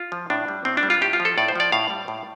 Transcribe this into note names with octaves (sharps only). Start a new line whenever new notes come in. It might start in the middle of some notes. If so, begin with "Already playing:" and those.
Already playing: F4
F3
A2 D4
G3
A2 C4
D4
G3
F4
A2 G4
F4
F3
A4
A2 D5
C5
F3 D5
A2 F5
G3
A2